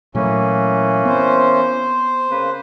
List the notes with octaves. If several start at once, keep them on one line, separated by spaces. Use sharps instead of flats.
A#2 E3 F#3 A3 A#3 C#4
B3 C4 C5
C#3 A#3 B4